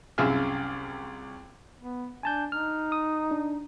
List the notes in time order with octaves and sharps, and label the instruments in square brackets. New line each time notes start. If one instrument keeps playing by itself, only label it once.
[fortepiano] C2 F#2 F4 G#4 E5 F6
[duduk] B3
[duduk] D4 [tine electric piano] G#5 A5 G6
[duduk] D#4 [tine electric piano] F6
[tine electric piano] D#6
D4